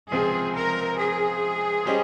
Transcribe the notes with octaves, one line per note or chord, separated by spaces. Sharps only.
C#2 C3 F3 C4 G#4
A#4
G#4
G3 C#4 G4 C5 D#5